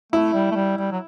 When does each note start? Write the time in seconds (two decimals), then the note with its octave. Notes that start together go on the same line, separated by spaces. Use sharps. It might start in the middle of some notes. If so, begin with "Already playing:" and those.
0.12 A3 E4
0.34 G3
0.51 A3
0.55 G3
0.78 G3
0.91 F#3